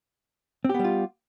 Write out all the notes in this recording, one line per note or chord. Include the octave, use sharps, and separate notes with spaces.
G3 B3 C4 F4 G4